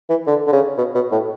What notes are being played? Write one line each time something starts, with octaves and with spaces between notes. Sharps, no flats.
E3
D3
D3
C#3
B2
B2
A2